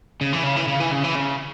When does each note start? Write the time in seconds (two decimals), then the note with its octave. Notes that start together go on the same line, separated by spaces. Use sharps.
0.21 C#3
0.33 E3
0.44 C#3
0.57 E3
0.68 C#3
0.80 E3
0.92 C#3
1.04 E3
1.15 C#3